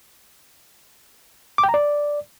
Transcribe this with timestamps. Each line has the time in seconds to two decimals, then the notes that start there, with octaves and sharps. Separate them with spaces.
1.58 D6
1.63 G5
1.69 A#5
1.74 D5